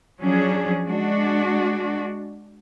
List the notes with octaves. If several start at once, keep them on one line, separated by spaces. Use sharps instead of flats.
F3 F#3 C#4 D4 G#4
G#3 D4 F#4